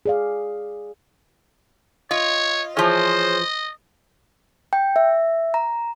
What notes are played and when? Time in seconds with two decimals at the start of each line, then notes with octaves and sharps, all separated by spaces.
0.06 G#4 D5 F5
2.11 F4 C#5 D#5
2.77 E3 F3 G#4 C5 C#5 D#5 F6
4.73 G5
4.96 E5
5.54 A#5